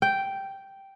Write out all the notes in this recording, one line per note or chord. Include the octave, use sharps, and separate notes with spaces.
G5